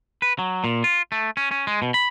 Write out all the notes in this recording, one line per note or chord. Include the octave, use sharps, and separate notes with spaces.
B4
F#3
A#2
F4
A3
C#4
C#4
G#3
B2
B5